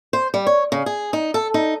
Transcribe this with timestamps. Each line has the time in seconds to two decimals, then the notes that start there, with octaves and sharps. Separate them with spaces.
0.13 C5
0.34 G3
0.47 C#5
0.72 C#3
0.86 G#4
1.13 D#4
1.34 A4
1.54 D#4